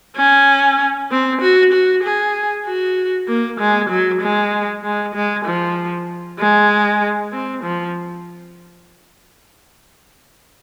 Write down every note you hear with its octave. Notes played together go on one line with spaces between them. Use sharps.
C#4
C4
F#4
F#4
G#4
F#4
A#3
G#3
F#3
G#3
G#3
G#3
F3
G#3
C4
F3